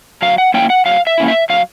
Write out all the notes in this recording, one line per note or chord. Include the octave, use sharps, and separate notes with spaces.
F#3 F5
F#5
A#3 C#4 E4 G5
F#5
F#3 F5
E5
A#3 C#4 E4
E5
F#3 F5